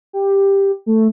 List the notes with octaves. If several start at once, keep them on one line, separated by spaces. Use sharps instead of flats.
G4
A3